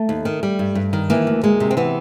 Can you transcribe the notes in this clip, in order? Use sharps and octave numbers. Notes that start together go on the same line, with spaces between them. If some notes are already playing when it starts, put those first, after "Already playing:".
Already playing: A3
D#2
D#3
G3
G2
G2
D#3
E3 A#3
D2
G#3 A#3
C3
C4
E3 B3